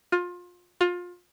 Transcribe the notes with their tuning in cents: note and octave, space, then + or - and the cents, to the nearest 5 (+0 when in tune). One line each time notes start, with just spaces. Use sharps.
F4 +25
F4 +25